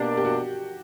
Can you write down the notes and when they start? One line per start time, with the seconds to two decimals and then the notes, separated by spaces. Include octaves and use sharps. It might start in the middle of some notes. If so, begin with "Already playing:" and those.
Already playing: B2 A#3 D4 G4
0.17 G4
0.25 F#4